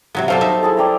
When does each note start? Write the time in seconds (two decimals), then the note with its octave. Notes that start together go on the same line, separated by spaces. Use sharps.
0.15 C3 F#3 B3
0.28 B2 F#3 G3 A4 C5 F5
0.41 D#4 E5
0.63 E4 G#4 A5
0.77 D5 G5 A#5